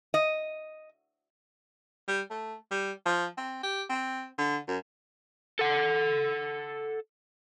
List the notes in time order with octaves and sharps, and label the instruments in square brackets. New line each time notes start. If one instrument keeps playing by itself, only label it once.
[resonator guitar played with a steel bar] D#5
[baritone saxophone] G3
A3
G3
F3
C4
G4
C4
D3
F#2
[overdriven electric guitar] A4 F#5